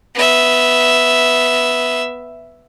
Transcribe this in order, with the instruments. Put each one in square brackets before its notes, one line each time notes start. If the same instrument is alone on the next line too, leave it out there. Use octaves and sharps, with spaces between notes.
[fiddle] B3 E5